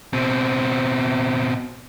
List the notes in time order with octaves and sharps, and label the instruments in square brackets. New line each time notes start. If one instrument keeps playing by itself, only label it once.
[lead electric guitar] B2 C4